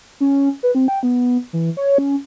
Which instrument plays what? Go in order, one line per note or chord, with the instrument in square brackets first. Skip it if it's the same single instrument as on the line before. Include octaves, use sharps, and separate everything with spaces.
[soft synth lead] C#4
B4
C4
G5
B3
E3
C#5
C#4